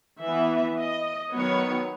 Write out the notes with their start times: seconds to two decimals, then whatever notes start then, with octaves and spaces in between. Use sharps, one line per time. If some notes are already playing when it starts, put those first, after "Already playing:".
0.22 E3 B3 E5
0.78 D#5
1.32 D#3 F#3 B3 C#5